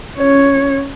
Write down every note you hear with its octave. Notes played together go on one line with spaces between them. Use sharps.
C#4 C#5